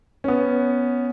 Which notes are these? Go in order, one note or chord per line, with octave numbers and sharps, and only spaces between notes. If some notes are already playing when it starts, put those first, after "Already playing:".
B3 C#4